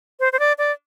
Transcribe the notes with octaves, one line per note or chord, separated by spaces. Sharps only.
C5
C5
D5
D5